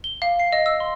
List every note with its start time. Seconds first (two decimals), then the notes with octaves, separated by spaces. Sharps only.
0.04 G7
0.22 F5
0.39 C7
0.52 D#5
0.66 E6
0.80 C6